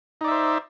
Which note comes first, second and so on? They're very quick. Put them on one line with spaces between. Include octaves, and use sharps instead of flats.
D#4 D5 E5 C5